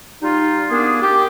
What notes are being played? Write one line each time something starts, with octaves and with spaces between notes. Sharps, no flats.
G3 D#4 F4
A#3 B3 D4 G#4
G4